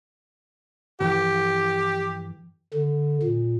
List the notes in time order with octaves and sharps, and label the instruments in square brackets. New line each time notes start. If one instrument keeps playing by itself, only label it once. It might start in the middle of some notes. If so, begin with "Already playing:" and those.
[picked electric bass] G2 E3 F3 [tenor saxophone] G4
[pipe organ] D3
A#2